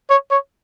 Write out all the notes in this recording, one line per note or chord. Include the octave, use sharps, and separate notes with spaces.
C#5
C#5